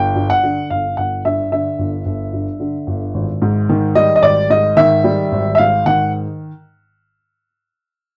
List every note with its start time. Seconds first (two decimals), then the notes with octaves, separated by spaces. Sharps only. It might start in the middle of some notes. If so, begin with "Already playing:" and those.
Already playing: G1 G5
0.15 G2
0.30 F#5
0.43 D3
0.70 G1 F5
0.97 G1 F#5
1.25 G2 E5
1.52 D3 E5
1.79 G1
2.06 G1
2.33 G2
2.60 D3
2.87 G1
3.14 G#1
3.42 G#2
3.69 D#3
3.95 G3 D#5
4.16 D#5
4.23 G#1 D5
4.50 G#2 D#5
4.77 D#3 E5
5.04 G3
5.32 G#1
5.55 E5
5.58 G#2 F5
5.86 D#3 F#5